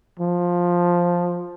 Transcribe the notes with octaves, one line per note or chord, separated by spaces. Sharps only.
F3